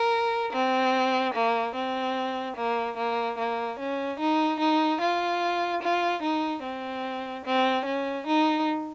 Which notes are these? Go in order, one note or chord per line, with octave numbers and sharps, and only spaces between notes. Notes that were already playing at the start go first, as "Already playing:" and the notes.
Already playing: A#4
C4
A#3
C4
A#3
A#3
A#3
C#4
D#4
D#4
F4
F4
D#4
C4
C4
C#4
D#4